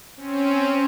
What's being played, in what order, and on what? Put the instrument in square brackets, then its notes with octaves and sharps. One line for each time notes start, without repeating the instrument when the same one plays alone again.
[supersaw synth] C4 C#4